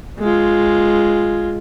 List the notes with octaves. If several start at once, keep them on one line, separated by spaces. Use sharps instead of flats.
G#3 F4